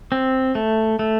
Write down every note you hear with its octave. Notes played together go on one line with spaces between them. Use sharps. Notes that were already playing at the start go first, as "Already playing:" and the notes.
C4
A3
A3